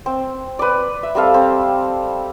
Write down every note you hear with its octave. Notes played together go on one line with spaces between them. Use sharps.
C4
B4 D5
E5
G3 C4 A4 F5
C4